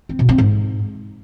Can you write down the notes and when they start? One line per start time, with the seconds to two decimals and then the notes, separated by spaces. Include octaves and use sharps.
0.09 C4
0.19 B2
0.29 C4
0.38 G#2